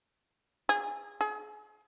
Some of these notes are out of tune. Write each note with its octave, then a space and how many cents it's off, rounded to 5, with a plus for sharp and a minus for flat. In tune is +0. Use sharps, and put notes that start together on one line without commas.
G#4 -25
G#4 +30